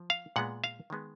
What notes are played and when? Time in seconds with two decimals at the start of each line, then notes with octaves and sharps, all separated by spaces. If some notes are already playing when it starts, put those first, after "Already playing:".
Already playing: F3
0.10 F5
0.36 A#2 G#3 B3 F#5
0.64 F5
0.90 D#3 G#3 B3